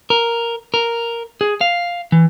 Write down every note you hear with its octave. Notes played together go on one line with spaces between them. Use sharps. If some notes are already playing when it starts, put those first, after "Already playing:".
A#4
A#4
G#4
F5
E3